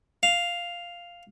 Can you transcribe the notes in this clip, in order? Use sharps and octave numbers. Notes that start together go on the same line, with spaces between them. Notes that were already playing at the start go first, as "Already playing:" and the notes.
F5